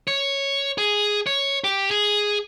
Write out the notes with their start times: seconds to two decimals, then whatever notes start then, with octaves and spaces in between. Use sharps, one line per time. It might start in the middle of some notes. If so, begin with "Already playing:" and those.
0.08 C#5
0.78 G#4
1.26 C#5
1.64 G4
1.91 G#4